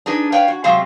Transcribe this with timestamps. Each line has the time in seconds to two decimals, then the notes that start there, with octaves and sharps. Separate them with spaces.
0.06 D4 D#4 G#4 B4
0.32 B4 C#5 D5 F5 G5
0.48 F#4
0.64 C3 F#3 G#3 C4 G#4 F5